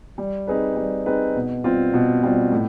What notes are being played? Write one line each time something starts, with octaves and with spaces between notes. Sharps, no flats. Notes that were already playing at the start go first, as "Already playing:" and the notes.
G3
C4 D#4 G#4 B4
G3
C4 D#4 G#4 B4
B2
G3 C4 F4
B2
G3 C4 F4
A2